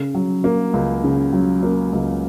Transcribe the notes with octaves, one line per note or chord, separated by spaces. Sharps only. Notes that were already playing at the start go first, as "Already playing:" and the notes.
Already playing: C#3
F#3
A#3
C#2
C#3
F#3
A#3
C#2